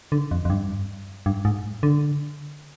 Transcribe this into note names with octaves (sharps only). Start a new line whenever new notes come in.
D3
F2
F2
G2
G2
G#2
D3